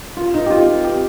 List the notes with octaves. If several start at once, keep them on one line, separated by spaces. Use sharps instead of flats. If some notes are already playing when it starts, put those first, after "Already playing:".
F4
D#4
G4
F4
G4